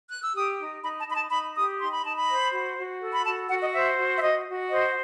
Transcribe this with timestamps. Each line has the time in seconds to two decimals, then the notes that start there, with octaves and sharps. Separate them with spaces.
0.10 F#6
0.21 E6
0.34 G4 D#6
0.59 D#4
0.82 D#4 B5
0.99 A5
1.07 D#4 B5
1.15 A5
1.30 D#4 B5
1.55 G4 D#6
1.79 D#4 C6
1.92 B5
2.04 D#4 A5
2.17 B5
2.28 C5
2.52 F#4
2.76 F#4
3.01 A4
3.13 B5
3.25 F#4 A5
3.49 F#4 F#5
3.61 D#5
3.73 C5 E5
3.97 F#4
4.17 E5
4.21 F#4 D#5
4.47 F#4
4.70 C5 D#5